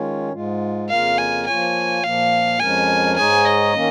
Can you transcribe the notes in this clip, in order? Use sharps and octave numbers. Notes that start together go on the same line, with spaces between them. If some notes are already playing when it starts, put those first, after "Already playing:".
Already playing: D#3 G#3 C#4 F4 C#5
G#2 G#3 F4
F2 C#3 A#3 F4 A#4 F5
G#5
F3 A#3 F4 C#5 G#5
A#2 F3 A#3 F5
F2 F3 G#3 C#4 A#4 G#5
G#2 G#3 D#4 G#4 C#5 G#5
D#5
D#3 A#3 C#4